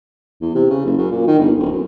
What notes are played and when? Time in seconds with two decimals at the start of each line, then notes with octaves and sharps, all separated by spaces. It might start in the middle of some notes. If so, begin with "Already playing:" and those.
0.42 E2
0.55 C3
0.70 C#3
0.85 F#1
0.98 F#2
1.11 A#2
1.27 D#3
1.39 G1
1.59 D1
1.71 F#2